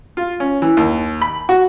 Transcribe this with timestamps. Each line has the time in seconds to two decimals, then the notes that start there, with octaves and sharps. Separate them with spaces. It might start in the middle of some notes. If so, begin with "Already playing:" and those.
0.17 F4
0.40 C#4
0.62 E3
0.77 D#2
1.22 B5
1.49 F#4